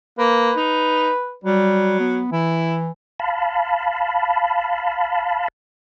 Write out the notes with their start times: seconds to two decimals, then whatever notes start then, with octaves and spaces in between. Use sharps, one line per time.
0.19 A#3 B4
0.56 D#4
1.44 F#3 G3
2.00 B3
2.32 E3 E4
3.20 F5 A5 B5